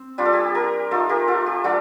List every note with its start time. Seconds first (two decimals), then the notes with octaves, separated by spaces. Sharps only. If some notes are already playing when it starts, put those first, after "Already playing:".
Already playing: C4
0.18 G3 D4 F4 G4
0.25 A4
0.33 G4
0.55 G4 A#4
0.91 A3 D#4 F4 A4
1.09 G4 A#4
1.28 F4 A4
1.46 G4
1.64 G3 D4 F4 A4